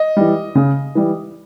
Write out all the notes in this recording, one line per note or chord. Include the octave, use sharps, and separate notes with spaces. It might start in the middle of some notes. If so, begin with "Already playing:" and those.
Already playing: D#5
E3 G3
C#3
E3 G3